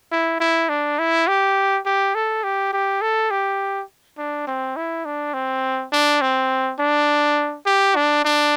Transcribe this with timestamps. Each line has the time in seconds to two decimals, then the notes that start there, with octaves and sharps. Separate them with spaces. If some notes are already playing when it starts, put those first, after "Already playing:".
0.12 E4
0.40 E4
0.69 D4
0.99 E4
1.28 G4
1.86 G4
2.15 A4
2.44 G4
2.73 G4
3.02 A4
3.31 G4
4.18 D4
4.47 C4
4.76 E4
5.05 D4
5.34 C4
5.92 D4
6.21 C4
6.79 D4
7.66 G4
7.96 D4
8.25 D4